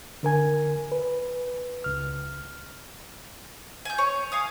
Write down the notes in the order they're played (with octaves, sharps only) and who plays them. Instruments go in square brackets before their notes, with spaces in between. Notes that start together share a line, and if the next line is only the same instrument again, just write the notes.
[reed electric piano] D3 A#4 G#5 G#6
B4
C#2 F6
[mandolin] G#5 G6
C#5
F5 G#5 D#6